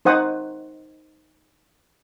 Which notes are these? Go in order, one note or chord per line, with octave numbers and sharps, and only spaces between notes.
D#4 C5 F#5 D#6